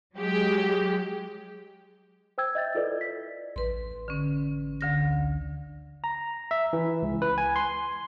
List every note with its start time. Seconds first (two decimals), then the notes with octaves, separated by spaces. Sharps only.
0.17 F#3 G#3 G4
2.38 C5 G5 E6 G#6
2.55 D#5 E5 G6 A6
2.75 E4 F4 A4 B4 D5 D#5
3.01 B6
3.56 A1 B4 C6
4.08 D3 C#4
4.81 D2 D3 A#6
6.04 A#5
6.51 E5
6.73 E3
7.02 C#2
7.22 B4
7.38 G#5
7.56 C6